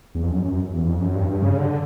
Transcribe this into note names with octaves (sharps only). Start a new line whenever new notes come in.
E2
F2
F#2
F#2
E2
F2
F#2
G2
G2
C#3
D3